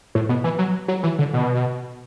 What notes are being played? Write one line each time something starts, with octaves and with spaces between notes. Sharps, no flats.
A2
B2
E3
F#3
F#3
E3
D3
B2